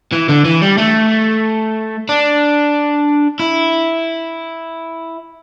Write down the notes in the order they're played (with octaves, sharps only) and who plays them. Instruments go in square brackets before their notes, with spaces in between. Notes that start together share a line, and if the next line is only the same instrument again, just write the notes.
[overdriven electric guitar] E3
D3
E3
G3
A3
D4
E4